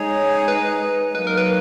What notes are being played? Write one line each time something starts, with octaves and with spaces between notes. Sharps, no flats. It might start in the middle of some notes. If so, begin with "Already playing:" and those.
Already playing: G#3 D#4 G#4 C#5
B4
F#3 A#3 D#4 B4
A#4
B4